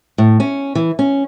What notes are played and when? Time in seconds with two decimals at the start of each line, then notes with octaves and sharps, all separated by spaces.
0.18 A2
0.40 C#4
0.75 E3
0.99 C#4